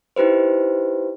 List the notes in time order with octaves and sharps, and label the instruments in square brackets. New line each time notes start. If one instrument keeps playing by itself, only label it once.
[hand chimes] D#4 E4 G4 B4 C5